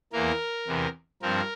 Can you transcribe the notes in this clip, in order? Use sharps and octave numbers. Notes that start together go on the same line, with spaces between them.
E2 E3 A#3 A#4
E2 C3 E3
G2 F3 C4 A#4